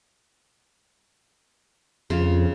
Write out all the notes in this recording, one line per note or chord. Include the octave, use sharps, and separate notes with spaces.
F2 C#3 F4